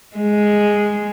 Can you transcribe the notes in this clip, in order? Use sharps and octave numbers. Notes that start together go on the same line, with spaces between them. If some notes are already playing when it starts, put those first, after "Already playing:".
G#3